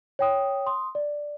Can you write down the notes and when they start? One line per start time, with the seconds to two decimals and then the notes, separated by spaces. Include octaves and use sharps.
0.19 C#5 G5 D#6
0.66 C6 D#6
0.95 D5